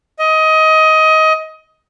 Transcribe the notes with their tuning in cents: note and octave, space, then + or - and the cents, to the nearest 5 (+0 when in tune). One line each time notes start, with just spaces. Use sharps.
D#5 +20